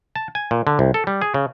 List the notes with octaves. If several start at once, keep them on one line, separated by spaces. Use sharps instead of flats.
A5
G#5
A#2
D3
C2
A4
G3
G#4
C#3